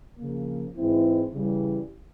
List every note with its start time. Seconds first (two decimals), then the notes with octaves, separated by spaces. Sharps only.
0.18 C#3 F3 A#3
0.76 G#2 E3 G#3 C4 E4
1.34 C#3 E3 G3